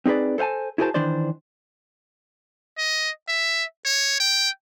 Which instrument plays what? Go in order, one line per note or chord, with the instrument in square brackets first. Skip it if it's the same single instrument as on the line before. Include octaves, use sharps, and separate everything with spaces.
[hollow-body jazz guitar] C4 D#4 G#4 B4 D5
A4 C5 F5 G#5 A5
E4 F#4 G#4 A#4 C5 A5
D#3 E3 D4 C5 D5
[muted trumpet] D#5
E5
C#5
G5